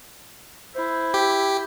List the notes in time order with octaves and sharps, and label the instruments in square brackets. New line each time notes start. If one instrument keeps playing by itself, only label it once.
[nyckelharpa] E4 [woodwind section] C5
[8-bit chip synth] G4